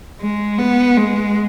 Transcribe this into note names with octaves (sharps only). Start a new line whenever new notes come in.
G#3
B3
G#3